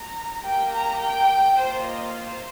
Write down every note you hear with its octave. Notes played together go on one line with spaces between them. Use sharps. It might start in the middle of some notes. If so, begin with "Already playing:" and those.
Already playing: A#5
A#3 G4 G5
A#5
G5
A#3 F4 C5
D#5
C5